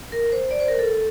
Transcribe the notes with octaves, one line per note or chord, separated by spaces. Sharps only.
A#4
C5
D5
C5
A#4
A4